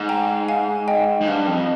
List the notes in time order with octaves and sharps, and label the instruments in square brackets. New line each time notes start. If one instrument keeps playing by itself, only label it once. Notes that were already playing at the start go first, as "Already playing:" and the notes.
Already playing: [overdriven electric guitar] G#2
[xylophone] G5 A#5
F5 G#5
D#5 G5
[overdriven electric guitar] G#2
[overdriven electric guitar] G2 [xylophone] F5
[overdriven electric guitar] F2